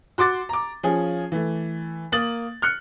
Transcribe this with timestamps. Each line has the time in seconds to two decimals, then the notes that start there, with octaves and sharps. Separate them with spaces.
0.18 F#4 C6 D6 A6
0.49 A#5 D6
0.83 F3 C#4 G#4
1.32 E3 A3
2.12 A#3 D#6 A6 F#7
2.62 F6 F#6 C#7